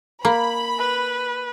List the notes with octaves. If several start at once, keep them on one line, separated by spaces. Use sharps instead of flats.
A#3 B5
B4